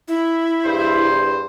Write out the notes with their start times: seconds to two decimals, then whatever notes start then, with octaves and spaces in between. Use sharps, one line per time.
0.08 E4
0.65 E2 G2 C5